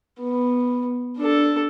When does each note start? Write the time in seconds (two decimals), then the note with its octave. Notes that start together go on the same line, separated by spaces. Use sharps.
0.21 B3
1.17 D4 A4